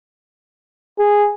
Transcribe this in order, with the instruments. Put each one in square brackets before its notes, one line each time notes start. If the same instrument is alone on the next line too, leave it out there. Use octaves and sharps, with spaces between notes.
[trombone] G#4